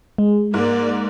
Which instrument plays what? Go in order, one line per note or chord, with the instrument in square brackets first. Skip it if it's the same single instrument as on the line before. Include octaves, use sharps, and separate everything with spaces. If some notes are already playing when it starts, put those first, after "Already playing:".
[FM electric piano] G#3
[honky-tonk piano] G#2 [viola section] A#3 D5